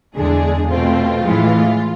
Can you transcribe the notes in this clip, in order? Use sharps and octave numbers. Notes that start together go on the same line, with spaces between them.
E2 D3 G#3 D4 G#4
B2 A3 C4 F4
A2 E3 G#3